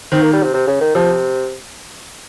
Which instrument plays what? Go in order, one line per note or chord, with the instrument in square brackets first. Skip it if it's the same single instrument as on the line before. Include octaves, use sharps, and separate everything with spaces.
[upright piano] D#3 [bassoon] C4
[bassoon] A#3
G3
C3
C3
C#3
D#3
[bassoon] C3 [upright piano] F3